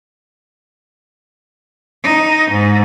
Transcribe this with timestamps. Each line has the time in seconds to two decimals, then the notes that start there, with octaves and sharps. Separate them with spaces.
2.04 D#4
2.51 G#2